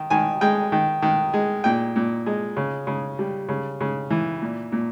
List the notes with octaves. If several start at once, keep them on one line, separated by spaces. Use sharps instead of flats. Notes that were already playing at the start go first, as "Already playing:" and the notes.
Already playing: D#3
D#3 G#5
G#3 G5
D#3
D#3
G#3
A#2 G5
A#2
G#3
C#3
C#3
G3
C#3
C#3
E3
A#2
A#2